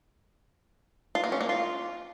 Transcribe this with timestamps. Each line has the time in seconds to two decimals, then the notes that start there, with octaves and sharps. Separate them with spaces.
1.15 F4
1.24 A#3
1.32 C#4
1.41 A#3
1.49 F4